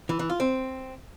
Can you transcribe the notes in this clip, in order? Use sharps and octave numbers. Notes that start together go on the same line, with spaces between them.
E3
E3
F4
C4